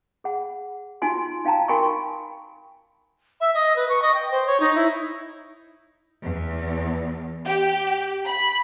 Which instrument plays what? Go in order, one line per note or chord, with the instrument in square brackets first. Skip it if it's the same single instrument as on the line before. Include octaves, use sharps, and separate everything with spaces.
[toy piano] G#4 F#5
D#4 F4 F#4 G#5 C6
D#4 F5 G5 A5 A#5
F#4 A#4 G5 G#5 B5 C#6
[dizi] E5
D#5
B4
C#6
D#5
G5
C5
C#5
D#4
E4
[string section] E2
G4
B5